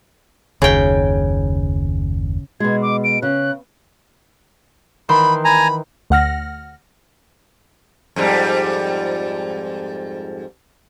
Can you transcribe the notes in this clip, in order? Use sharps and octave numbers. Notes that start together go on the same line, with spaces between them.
F#1 D#2 C#3 G5
B2 G#3 G#6
D6
D7
C#3 F#6
D#3 E3 B5 C6
G#5 A#5 B5
D2 F#5 F6 A#6
F2 G#2 G3